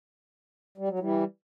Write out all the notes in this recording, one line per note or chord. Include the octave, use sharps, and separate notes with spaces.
G3
F#3
E3 G3